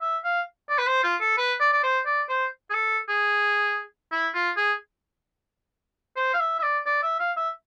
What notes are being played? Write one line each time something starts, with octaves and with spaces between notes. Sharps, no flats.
E5
F5
D5
B4
C5
F4
A4
B4
D5
D5
C5
D5
C5
G#4
A4
G#4
E4
F4
G#4
C5
F5
E5
E5
D5
D5
E5
F5
E5